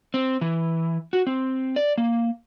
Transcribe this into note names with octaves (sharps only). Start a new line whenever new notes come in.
C4
E3
F#4
C4
D5
A#3